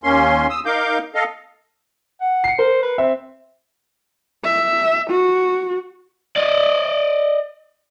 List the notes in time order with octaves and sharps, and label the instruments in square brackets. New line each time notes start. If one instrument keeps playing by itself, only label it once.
[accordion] D#2 A#3 C#4 C6
D#6 E6
D#4 A#4 F5 D6 G6
A4 D#5 F5
[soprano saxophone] F#5
[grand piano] C7 C#7
[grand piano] A#4 [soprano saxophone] C5
[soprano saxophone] B4
[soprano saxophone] C4 [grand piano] E5
[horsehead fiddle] E5
F#4
[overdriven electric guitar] D5 D#5